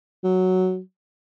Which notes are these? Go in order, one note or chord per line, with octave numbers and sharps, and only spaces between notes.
F#3